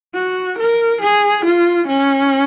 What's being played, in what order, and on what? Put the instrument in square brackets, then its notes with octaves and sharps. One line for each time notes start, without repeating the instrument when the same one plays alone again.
[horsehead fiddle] F#4
A#4
G#4
F4
C#4